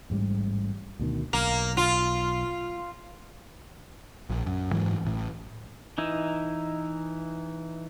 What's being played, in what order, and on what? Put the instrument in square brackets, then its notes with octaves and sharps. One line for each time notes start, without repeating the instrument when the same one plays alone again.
[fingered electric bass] A1 G#2 G3
D2 B2 D#3
[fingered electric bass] B1 [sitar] A#3
[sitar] F4
[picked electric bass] A#1
F#2
G#2 E3 F#3
A1 A2
[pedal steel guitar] E3 D#4 E4